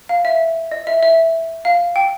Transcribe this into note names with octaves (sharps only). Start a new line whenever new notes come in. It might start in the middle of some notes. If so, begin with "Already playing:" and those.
F5
E5
D#5
E5
E5
F5
G5